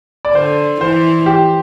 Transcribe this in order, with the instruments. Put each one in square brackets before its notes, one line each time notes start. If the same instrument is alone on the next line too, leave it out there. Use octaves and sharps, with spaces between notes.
[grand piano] D5
[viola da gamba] D3 [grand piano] C5
[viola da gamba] E3 [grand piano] C5
[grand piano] G4